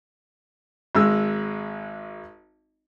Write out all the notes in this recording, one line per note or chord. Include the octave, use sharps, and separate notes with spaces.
G#1 G#3 E6